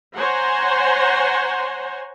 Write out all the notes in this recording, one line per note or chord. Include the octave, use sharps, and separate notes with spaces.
C5 C#5 F#5 G#5 A#5 C6